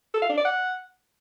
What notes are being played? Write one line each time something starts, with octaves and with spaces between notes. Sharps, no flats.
A4
F5
D4
D5
F#5